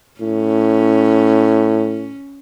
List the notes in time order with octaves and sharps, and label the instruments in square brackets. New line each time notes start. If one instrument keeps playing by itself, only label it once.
[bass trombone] A2 [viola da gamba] C#4